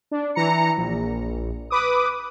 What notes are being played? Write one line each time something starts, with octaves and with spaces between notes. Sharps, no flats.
D4
E3 A#5 C#7
A#1
B4 D6 D#6